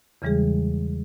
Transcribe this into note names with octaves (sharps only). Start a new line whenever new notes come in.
E2 C#3 E3 G3 G#3 G#4